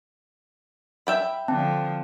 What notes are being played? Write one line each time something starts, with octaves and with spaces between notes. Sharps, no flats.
E5 G5 B5
D3 F3 C4 A5